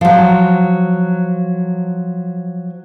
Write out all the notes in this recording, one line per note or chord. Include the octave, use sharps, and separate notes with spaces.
F3 F#3